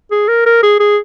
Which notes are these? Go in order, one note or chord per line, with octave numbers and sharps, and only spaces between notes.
G#4
A#4
A#4
G#4
G#4